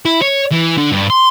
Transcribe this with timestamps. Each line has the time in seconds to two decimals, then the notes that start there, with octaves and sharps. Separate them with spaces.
0.05 E4
0.22 C#5
0.51 E3
0.77 D3
0.92 G2
1.10 C6